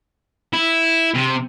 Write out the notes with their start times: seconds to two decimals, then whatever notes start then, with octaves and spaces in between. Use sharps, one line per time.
0.53 E4
1.15 C3